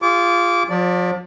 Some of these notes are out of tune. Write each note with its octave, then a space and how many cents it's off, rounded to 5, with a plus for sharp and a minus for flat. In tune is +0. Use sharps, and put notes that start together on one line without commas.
F4 -10 G#4 -40 D6 -30
F3 +40 D5 +0